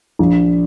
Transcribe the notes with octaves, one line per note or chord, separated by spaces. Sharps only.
A#1